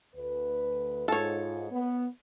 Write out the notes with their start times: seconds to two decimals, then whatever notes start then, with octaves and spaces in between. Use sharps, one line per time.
0.14 D2 B4
1.08 G#2 F4 A4 C#5
1.71 B3